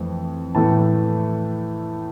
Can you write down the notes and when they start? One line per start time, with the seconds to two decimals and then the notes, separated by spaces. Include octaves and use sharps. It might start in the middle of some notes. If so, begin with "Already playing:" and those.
Already playing: F2 E3 A3
0.55 A2 E3 A3 A5